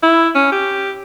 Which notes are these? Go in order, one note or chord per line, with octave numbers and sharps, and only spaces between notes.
E4
C#4
G4